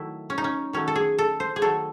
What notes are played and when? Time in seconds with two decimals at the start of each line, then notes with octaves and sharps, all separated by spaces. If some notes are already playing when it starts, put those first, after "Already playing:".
Already playing: D#3 F#3 A3 E4
0.30 C#4
0.38 D#4
0.44 C#4
0.73 D#3 F#3 A3 C#4
0.88 A4
0.95 G#4
1.18 A4
1.40 C5
1.56 G#4
1.61 D#3 F#3 A3 A4